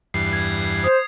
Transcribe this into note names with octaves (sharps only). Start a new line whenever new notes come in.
E2 G2 C7
G#6
C5 D#6